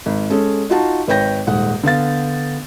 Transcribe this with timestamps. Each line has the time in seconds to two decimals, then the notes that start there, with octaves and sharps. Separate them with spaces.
0.06 G#1
0.30 G#3 C#4 A4
0.70 D#4 F4 F#4 A5
1.07 G#1 B4 C#5 G5 G6 A#6
1.47 D#1 G#2 F#5
1.83 D3 B3 F5 A6